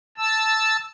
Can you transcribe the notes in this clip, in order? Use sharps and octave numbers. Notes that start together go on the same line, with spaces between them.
A5 E6